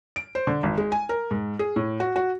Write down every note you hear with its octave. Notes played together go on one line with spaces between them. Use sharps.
D7
C5
D3
G#1
G#3
G#5
A#4
G#2
G#4
A2
F#4
F#4